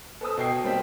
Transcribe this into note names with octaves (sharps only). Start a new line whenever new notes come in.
A4 B4 C5 A5 D#6 E6
B2 D#5 G5 C7
G3 A#3 C4 G5 B6